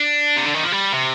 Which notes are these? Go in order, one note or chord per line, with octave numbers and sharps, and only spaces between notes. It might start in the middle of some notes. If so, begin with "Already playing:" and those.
Already playing: D4
C3
D3
D#3
F3
G3
C3